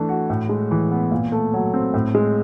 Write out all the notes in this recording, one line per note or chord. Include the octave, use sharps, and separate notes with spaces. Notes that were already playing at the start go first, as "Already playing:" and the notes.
Already playing: E3 A3 D4
F#4
A2
G#3
E3
B3
A#2
A3
F#3
C4
A2
G#3